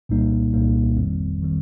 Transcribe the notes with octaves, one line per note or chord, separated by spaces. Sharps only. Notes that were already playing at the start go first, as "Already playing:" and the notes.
C2 A#2 G3 A#3 D#4
C2 A#2 G3 A#3 D#4
G1 F2 D#3 G3 C4
D#3 G3 C4